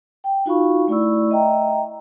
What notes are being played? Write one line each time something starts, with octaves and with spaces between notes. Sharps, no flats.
G5
D#4 F4 F#4 F5 B5 C#6
A3 E4 D5 B5 C#6 E6
D#5 E5 G5 A#5